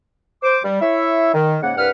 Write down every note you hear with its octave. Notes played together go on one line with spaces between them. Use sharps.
C5 D6
G3
E4 C#5 E5
D#3
G#2 C#3 A#3 F#5
C2 G2 B4 F#5 F6